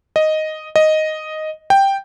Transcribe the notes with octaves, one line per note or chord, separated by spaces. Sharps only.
D#5
D#5
G5